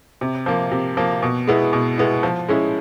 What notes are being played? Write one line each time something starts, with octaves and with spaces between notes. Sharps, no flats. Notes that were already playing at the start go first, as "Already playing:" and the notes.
C3
F3 A#3
C3
F3 A#3
B2
G#3 B3 E4
B2
G#3 B3 E4
F3
G#3 C#4 E4